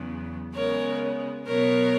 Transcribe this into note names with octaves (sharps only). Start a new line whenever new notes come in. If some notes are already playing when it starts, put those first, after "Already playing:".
Already playing: E2 C#3 F#3 B3
C#3 G#3 B3 A#4 C#5
B2 F#3 B3 A#4 C#5